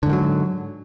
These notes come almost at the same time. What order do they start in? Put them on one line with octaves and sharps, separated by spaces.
D3 G#2 D#3 F#3